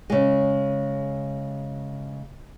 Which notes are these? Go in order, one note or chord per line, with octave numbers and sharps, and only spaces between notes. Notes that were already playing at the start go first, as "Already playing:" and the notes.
C#3 G#3